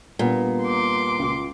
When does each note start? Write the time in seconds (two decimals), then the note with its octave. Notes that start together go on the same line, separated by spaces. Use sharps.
0.19 A#2 G3 B3 D4
0.63 C6 D6
1.19 C#2 F4